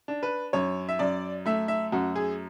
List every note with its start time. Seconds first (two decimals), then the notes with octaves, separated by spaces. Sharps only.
0.08 D4
0.23 B4
0.53 F#2 C#5
0.89 E5
0.99 F#2 D5
1.46 A3 E5
1.68 E5
1.92 F#2 F#4
2.16 G#4